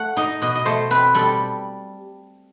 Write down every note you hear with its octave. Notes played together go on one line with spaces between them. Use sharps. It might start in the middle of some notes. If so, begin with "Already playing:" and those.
Already playing: A3 F#5
D#4 D#5
B2 D#5
D#5
A3 C5
C4 B4
G3 A4